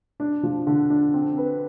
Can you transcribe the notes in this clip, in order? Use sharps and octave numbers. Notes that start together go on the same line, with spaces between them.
D4
F3
D3
D4
C4
B4